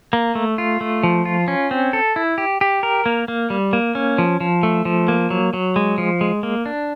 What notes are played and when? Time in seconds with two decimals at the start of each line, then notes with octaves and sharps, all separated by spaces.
0.13 A#3
0.35 A3
0.58 F4
0.81 A3
1.03 F3
1.25 F4
1.48 C#4
1.71 C4
1.93 A4
2.16 E4
2.38 G4
2.61 G4
2.83 A#4
3.06 A#3
3.28 A#3
3.50 G3
3.73 A#3
3.95 C#4
4.18 F3
4.40 F3
4.63 A3
4.85 F3
5.08 A#3
5.30 F#3
5.53 F#3
5.76 G#3
5.98 F3
6.21 G#3
6.43 A#3
6.66 D4